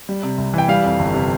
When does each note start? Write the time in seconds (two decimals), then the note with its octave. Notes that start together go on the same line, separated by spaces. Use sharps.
0.09 G3
0.23 C3
0.38 C2
0.54 E3 G5
0.68 G3 F5
0.84 F2
0.99 G1
1.14 C3